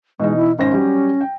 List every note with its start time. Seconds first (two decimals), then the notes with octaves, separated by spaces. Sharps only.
0.20 B2 E3 G#3 D#4
0.37 E4
0.59 G#1 C#4 C5 A#6
0.72 F#3 G3 G4
1.21 G5